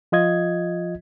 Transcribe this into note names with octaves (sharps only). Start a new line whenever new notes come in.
F3 F4 D#5 G#6